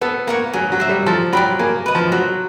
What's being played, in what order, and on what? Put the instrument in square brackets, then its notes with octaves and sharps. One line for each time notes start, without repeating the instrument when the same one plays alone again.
[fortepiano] B3 [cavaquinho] A4
[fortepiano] A#3 [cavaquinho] C#5 F#5 A#5
[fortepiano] F#3 [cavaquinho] G#4
[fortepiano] F#3
[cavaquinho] C5 E5
[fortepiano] G3
[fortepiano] F3 [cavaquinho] A4
[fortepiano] F#3 [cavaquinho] D5 G5 B5
[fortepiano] A#3 [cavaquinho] G#4
[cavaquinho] B4 D#5
[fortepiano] F3
[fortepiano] F#3 [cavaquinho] F#4